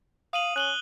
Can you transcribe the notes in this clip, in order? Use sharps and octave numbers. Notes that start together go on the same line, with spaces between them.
F5 D#6 D#7 F#7
C#4 F#6 F#7 G7